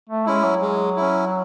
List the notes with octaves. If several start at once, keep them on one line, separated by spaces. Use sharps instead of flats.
A3
G#3 C#4 E4
F#3
G#3
C#4 E4